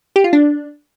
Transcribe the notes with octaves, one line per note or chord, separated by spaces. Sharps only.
G4
F4
D4